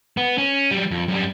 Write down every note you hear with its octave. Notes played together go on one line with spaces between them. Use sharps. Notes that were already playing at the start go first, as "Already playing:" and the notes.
B3
C#4
F#3 G3
F2
F#2 G3